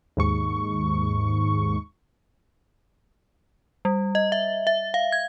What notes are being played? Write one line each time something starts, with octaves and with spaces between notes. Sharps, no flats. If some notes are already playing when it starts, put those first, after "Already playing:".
D#2 G#2 C#6
G3
D#5
E5
E5
F5
G#6